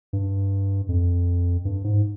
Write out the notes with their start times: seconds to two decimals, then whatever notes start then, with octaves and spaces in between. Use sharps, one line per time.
0.13 G2
0.89 F2
1.65 G2
1.84 G#2